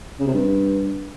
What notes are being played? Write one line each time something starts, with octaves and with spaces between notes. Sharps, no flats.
C#3
C3
G2